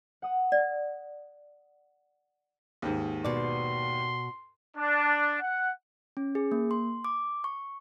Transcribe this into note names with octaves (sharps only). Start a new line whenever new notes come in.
F#5 D#6
D5
D#2 G#2
B2 D5 C6
D4
F#5
C#4
G#4
A#3
C6
D6
C#6